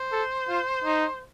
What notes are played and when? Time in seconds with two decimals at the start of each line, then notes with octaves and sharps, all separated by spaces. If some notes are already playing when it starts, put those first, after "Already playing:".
Already playing: C5
0.12 A4
0.49 F4
0.84 D#4